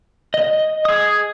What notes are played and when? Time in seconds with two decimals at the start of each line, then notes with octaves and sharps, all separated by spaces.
0.34 D#5
0.85 G#4 D#6